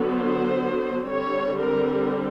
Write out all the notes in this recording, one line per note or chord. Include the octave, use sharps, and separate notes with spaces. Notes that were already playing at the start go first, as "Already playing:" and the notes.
Already playing: D3 F#3 B3
C5
D3 G3 C4 C#5
A#4